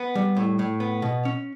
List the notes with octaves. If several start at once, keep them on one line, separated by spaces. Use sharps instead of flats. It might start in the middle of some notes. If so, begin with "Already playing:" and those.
Already playing: B3
G3
A2
A2
B3
B2
C#4